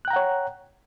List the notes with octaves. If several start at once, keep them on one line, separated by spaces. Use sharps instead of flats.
C#5 F#5 G5 A#5 F#6